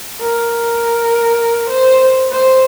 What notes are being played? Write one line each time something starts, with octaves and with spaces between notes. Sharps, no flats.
A#4
C5
C5